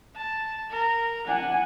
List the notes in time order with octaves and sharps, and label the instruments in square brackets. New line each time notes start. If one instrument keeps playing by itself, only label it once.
[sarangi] A5
A#4
[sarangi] D4 [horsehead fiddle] F#5 G#5